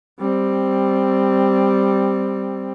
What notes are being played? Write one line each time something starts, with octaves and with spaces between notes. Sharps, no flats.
G3 C4